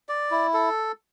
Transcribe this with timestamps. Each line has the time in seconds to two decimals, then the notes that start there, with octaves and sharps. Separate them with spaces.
0.09 D5
0.31 E4
0.54 A4